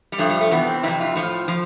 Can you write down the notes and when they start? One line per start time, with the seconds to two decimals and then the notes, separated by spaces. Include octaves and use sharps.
0.12 G3
0.18 G2 F3 A3
0.30 G3
0.41 A3
0.51 E2 C3 E3 B3
0.67 C4
0.83 F2 C3 E3 E4
1.00 F4
1.15 A2 F3 F4
1.48 F3